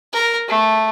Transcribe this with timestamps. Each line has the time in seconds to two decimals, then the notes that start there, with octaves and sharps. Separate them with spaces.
0.13 A#4
0.48 A3